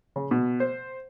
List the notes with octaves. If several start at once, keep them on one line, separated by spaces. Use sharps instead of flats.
C#3
B2
C5